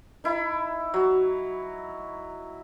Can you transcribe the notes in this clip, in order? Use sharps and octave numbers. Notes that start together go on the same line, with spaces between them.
D#4 E4 B5
F#3